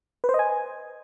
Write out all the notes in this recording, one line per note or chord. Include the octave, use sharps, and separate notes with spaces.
B4
C5
D#5
G#5